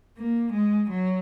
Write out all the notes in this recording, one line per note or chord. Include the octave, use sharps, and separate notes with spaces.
A#3
G#3
F#3